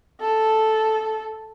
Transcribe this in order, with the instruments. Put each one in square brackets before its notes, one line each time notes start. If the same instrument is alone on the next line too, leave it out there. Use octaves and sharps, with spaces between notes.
[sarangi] A4